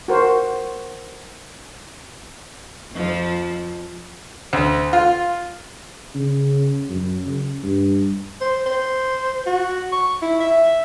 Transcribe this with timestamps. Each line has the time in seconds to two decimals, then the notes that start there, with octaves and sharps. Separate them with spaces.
0.08 F#4 A#4 C5
2.93 F2 F3
4.53 D2
4.93 F4
6.15 C#3
6.90 F#2
7.26 C#3
7.63 G2
8.41 C5
8.66 C5
9.46 F#4
9.92 C#6
10.22 E4
10.40 E5